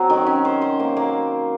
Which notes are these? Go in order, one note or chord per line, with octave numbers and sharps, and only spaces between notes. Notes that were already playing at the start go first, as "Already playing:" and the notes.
Already playing: F#3 C4
D#3
C#4
C5
C5
A#3
A#3